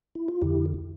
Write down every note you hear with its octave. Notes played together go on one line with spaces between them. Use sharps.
E4
F4
F2 D3 E4 G4